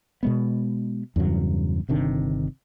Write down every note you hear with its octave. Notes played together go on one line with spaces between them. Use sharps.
B2 G#3 B3
E2 G2 C#3 F#3
G1 C3 D#3 D4